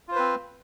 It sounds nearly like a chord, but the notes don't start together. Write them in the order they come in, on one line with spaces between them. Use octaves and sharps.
F4 C5 B4 C4